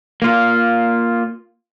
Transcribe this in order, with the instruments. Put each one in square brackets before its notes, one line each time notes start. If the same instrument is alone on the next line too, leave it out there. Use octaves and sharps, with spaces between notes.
[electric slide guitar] A#3 F4